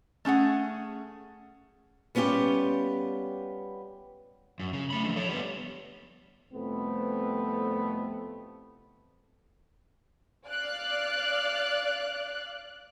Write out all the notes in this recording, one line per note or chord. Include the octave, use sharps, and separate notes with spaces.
A3 C#4 G#4 F#5
G3 B3 C#4 F4 G4
F#2
C#3
A3 B5
D3 F3
A4 C#5
G3 B3
C2 F2 A3 B3 C4 B4
D5 F5 F#6